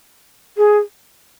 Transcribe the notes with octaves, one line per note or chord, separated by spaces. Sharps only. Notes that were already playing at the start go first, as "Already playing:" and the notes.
G#4